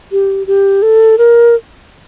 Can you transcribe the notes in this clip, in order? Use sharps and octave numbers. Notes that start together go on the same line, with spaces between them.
G4
G4
A4
A#4